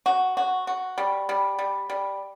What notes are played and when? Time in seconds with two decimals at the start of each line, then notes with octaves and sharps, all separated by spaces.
0.06 F#4
0.37 F#4
0.67 F#4
0.98 G3
1.29 G3
1.59 G3
1.90 G3